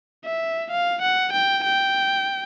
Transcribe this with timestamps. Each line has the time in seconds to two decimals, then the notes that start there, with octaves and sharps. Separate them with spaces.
0.25 E5
0.71 F5
1.02 F#5
1.33 G5
1.64 G5